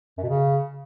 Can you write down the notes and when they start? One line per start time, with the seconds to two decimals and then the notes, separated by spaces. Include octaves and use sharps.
0.18 F#2
0.23 B2
0.29 C#3